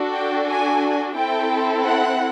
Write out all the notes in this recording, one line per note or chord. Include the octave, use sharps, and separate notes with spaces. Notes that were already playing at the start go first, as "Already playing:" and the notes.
Already playing: D4 F#4 A4
G5
G#5
C4 E4 A4 G5
F#5